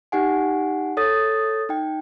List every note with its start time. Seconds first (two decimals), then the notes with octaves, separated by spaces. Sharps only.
0.12 D#4 G4 F#5 G#5
0.97 A4 C#5 D#6 A6
1.69 D#4 G5